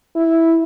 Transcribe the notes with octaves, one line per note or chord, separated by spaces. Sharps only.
E4